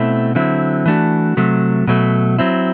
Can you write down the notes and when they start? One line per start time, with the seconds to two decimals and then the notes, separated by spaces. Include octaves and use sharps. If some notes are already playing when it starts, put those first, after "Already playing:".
Already playing: B2 A3 C4 E4
0.35 D3 F#3 C4 E4
0.86 E3 A3 D4 F#4
1.37 C3 F#3 A3
1.87 B2 F#3 A3
2.39 F#3 C4 E4